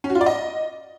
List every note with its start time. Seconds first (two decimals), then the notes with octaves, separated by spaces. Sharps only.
0.04 C#4
0.10 F#4
0.15 F4
0.21 D5
0.26 D#5